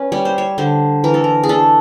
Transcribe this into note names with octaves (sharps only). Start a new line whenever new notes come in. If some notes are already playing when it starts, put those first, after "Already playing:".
Already playing: C#4 B4
G3 C#5
C5
C#5
D3 C5
E3 A#4
A4
A#4
G#4
D4 A4